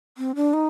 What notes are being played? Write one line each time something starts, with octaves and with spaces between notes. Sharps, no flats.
C4
D4
D#4